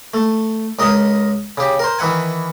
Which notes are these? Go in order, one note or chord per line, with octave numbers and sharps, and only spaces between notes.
A3
C#2 A#4 D#5 D#6
C#3 G4
A#4 C5
D#3 E3 E5 F#5 G#5